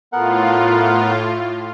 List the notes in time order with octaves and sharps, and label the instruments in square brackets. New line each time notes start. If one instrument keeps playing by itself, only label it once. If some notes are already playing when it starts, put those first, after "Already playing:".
[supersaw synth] A2 F4 [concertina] B3 A#4 F#5